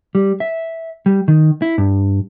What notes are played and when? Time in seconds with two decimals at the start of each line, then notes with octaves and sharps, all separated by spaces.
0.15 G3
0.40 E5
1.06 G3
1.28 D#3
1.62 E4
1.78 G2